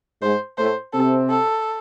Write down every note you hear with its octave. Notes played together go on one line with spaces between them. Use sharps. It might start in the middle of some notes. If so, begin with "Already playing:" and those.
G#2 G#3 C5
A2 A3 C5
C3 C4 A4
A4